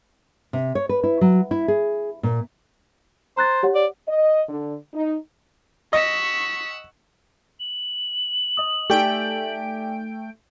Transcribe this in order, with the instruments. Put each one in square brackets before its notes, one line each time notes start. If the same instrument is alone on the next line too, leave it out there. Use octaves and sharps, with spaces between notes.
[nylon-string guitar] C3
C#5
B4
E4
F#3
E4
G#4
A#2
[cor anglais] C5 [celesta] A#5 F#6 A6
[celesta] G4 C#5 F#5
[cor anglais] D5
[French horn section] D#5
D3
D#4
[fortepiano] D#5 [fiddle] F#5 E6 [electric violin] C#6 B6
[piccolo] F#7
[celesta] D#5 D#6
[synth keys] A3 G5 D7 [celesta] D#4 D5 G#5 [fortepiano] G4